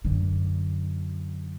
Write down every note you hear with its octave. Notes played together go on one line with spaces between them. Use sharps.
F#2 D3